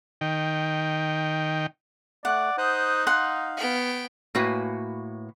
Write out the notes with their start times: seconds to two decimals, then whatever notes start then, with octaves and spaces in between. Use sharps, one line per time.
0.21 D#3 G5
2.25 A3 D5 F#5
2.58 D#4 C5 D#6 F#6
3.07 F5 F#5 C6
3.57 B3 G5
4.35 A2 A#3 F#4 B4 G#5